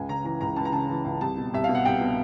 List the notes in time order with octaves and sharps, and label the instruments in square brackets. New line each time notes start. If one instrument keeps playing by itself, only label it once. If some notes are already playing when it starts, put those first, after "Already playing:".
Already playing: [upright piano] C#2 G#5
C#3 A#5
E3 A#5
C#2 A#5
C#2 A5
A#5
C#3 A5
E3
C#2
C2 A5
B2
C2 E5
B2 F5
F#5
C2 G5
B2